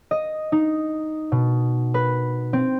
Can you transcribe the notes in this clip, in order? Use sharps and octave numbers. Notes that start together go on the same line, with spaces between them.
D#5
D#4
B2
B4
C4